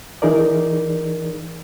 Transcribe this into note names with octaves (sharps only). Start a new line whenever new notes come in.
E3 D#4 G#4 A#4 D5